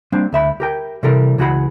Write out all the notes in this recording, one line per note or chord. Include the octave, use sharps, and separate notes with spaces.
G3 A#3 C4 D4
D2 E5 B5
G4 A#4 G5
C3 E3 G3 A4 A#4
C#2 E3 F#4 G#4 F#5 B5